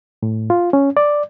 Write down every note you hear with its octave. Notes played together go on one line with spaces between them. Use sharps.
A2
F4
C#4
D5